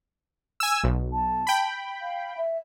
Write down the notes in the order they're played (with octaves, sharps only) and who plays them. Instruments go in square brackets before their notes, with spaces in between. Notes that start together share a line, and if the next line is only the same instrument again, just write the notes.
[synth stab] G#5 E6
B1
[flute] A5
[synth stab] G5 B5
[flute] F5
E5